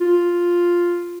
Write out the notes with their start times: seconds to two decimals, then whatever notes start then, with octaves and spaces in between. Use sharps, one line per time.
0.01 F4